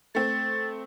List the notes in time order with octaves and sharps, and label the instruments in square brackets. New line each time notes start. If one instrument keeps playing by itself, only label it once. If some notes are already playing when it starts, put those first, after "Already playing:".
[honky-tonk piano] A3 C4 [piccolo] A6